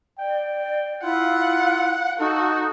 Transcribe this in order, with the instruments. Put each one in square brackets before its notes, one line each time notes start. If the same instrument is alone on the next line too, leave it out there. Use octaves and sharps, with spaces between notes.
[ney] D5 [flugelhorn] G5
[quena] E4 [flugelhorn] F4 [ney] F5 [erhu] F#5
[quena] D#4 [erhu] F#4 [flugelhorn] A4